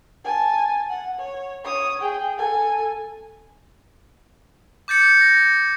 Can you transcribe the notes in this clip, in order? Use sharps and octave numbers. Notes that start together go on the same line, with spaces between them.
G#5 A5
F#5
C#5
C#5 D#6
G#4 G5
A4 G#5
D6 G6 A6 C#7
A#6